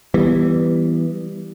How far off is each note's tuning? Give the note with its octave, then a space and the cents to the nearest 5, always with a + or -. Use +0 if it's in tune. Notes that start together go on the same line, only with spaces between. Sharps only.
E3 +5 G3 +0 B3 +0